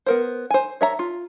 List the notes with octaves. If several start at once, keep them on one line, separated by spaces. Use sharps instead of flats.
B3 A#4 C5
C5 G#5
C#5 E5 A#5
F4